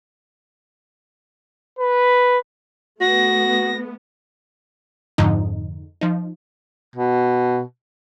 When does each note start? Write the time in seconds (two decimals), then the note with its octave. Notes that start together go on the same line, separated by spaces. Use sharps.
1.79 B4
3.01 A3 B3 F#4 A#6
5.18 F2 G#2 D3 F3 D#4
6.01 F3 D#4
6.96 B2